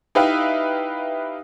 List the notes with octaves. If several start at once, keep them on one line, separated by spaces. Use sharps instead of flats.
D#4 E4 G4 B4 E5 F5